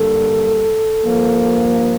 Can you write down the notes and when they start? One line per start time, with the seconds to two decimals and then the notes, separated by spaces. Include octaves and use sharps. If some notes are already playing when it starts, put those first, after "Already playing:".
Already playing: G2 D3 G3 A#3 A4
1.05 G2 F3 A#3